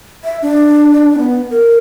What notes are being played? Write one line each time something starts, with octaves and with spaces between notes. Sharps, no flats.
E5
D4
B3
A#4